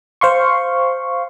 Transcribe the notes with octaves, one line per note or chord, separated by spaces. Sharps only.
C5 F5 C6 C#6